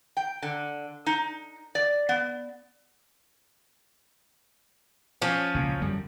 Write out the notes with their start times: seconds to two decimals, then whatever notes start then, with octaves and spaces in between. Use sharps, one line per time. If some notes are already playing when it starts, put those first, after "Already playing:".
0.17 G5
0.42 D3
1.06 D#4
1.75 D5
2.09 B3
5.22 F3 C#4
5.54 C#2 A#2
5.82 F#2 D3 G3